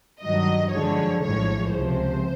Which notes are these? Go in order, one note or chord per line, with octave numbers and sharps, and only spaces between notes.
G2 D#3 F#3 D#5
F#2 D3 F3 G#3 C#5
A#1 A2 F3 G#3 C#5
C#2 C3 F3 C5